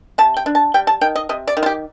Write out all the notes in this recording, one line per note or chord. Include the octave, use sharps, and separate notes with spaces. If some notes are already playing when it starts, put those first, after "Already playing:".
C3 A5
G5
D4
A5
G3 G5
A5
D#3 G5
D#5
C3 D#5
D5
D#3
F4
G4